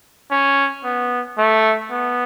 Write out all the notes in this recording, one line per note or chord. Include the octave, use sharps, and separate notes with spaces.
C#4
B3
A3
B3